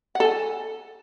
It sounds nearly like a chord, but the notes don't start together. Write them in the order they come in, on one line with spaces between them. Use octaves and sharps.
F#5 A4 G#5